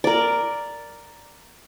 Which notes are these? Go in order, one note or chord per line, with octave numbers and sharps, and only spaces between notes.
A#4 D5